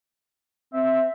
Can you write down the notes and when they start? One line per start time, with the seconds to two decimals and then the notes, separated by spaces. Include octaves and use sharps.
0.73 C4 E5